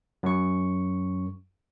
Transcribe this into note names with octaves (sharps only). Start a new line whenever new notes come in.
F#2 C#6